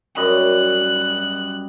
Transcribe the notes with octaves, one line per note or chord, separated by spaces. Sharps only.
F#2 G3 D#5 F#6